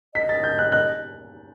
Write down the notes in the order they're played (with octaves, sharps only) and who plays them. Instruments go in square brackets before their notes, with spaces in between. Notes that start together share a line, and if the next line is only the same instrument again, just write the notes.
[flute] D#5 [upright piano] B6
[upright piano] A6
G6
F#6
[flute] D#5 [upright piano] F#6